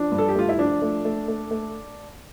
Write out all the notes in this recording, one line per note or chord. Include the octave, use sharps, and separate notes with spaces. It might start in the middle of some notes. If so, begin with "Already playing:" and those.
Already playing: F3 D4
G2
A4
G4
A3 F4
E4
F3 D4
A3
A3
A3
A3